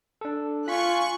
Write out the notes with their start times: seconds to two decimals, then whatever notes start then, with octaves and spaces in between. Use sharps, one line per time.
0.21 D4 A4
0.68 F4 G#5 C#6 F#6 B6